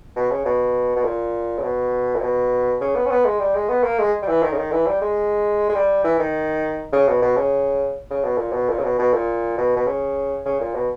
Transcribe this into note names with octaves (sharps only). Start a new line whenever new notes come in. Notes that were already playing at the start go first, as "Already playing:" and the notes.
B2
C#3
B2
B2
A#2
C#3
B2
A#2
B2
C#3
B3
C#4
B3
G#3
G3
G#3
B3
A#3
G#3
G3
E3
D#3
C#3
D#3
E3
G3
G#3
G#3
G3
E3
D#3
C#3
B2
B2
C#3
C#3
B2
A#2
B2
A#2
C#3
B2
B2
A#2
B2
B2
C#3
C#3
A#2
B2